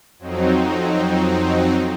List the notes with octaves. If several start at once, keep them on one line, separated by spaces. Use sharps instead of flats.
F2 F#3 C4 D#4